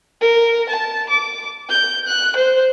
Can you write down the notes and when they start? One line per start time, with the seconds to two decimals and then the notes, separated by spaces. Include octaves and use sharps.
0.21 A#4
0.69 A5
1.09 D6
1.69 G6
2.07 F#6
2.36 C5